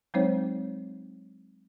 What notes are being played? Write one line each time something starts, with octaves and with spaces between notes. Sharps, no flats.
F#3 G#3 C4 D#4 C5 C#5